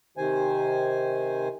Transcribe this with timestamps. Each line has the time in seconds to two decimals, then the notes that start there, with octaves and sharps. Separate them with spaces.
0.17 C3 D#3 C5 G#5